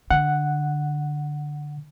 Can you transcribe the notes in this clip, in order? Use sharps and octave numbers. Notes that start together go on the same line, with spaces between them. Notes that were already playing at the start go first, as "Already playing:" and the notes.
D3 F#5